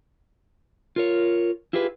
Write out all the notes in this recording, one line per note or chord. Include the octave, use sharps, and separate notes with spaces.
F4 A#4 C#5
E4 F4 G4 G#4 B4